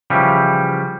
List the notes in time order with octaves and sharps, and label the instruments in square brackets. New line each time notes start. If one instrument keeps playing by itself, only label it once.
[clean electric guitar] C#3 E3 F3 G3